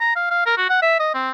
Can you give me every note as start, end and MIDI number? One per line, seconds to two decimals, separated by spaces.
0.01 0.14 82
0.16 0.27 77
0.30 0.46 77
0.46 0.55 70
0.57 0.66 66
0.70 0.78 78
0.82 0.96 76
1.00 1.10 75
1.14 1.31 60